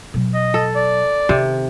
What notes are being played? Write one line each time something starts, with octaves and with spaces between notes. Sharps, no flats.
B2 F#3
D#5
A4
D5
C3 D#3